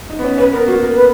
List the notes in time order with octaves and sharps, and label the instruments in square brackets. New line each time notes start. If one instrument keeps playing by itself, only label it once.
[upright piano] D#4
B3
C#4
[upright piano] C#4 [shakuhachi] B4
[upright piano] B3 [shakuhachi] A#4
[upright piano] A#3 [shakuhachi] F#4
[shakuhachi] A#4
B4